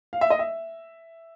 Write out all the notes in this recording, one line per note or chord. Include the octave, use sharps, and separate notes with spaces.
F5
E5
D#5
E5